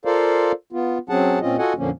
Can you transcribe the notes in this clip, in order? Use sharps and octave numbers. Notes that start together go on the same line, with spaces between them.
F4 A4 A#4 C5 D5 F5
B3 F4
F#3 C4 C#4 G#4 F#5 A5
A#2 C4 C#4 F4 D#5
F4 F#4 A4 D#5 F#5 G#5
F2 A#2 D3 F3 A#3 C#4